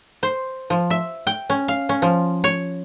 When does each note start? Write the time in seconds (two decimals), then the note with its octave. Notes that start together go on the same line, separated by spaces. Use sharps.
0.23 C5
0.70 F3
0.90 E5
1.27 G5
1.50 C#4
1.68 F5
1.89 C#4
2.02 F3
2.44 C#5